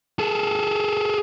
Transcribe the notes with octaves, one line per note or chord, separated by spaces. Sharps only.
G#4 A4